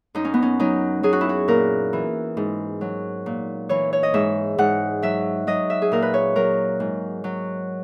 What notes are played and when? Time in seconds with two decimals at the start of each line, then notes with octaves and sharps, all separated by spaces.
0.15 F#2 D#4
0.25 C#4
0.34 B3
0.42 C#4
0.59 F#3 D#4
1.03 F#3 G#4
1.13 F#4
1.21 E4
1.29 F#4
1.48 A#2 A#4
1.93 E3
2.37 G#2
2.81 F#3
3.26 A#2
3.69 E3 C#5
3.93 C#5
4.03 D#5
4.14 G#2 E5
4.58 G#2 F#5
5.02 F#3 E5
5.47 F#3 D#5
5.70 E5
5.82 G#4
5.92 A#2 A#4
6.02 B4
6.14 C#5
6.36 F#3 A#4
6.80 G#2
7.24 F#3